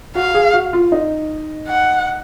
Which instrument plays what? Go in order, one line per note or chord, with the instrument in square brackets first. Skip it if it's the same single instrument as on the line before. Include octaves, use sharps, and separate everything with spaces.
[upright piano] F#4 [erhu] F5
[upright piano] G#4
F#4
F4
D#4
[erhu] F#5